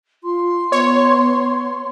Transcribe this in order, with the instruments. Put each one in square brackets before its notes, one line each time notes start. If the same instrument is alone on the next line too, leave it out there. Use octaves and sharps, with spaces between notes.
[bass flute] F4 [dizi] C6
[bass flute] B3 [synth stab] C#5